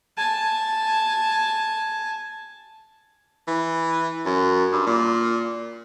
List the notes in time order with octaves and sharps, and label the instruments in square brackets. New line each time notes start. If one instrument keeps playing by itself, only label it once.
[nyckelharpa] G#5 A5
[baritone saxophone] E3
F#2
G2
A#2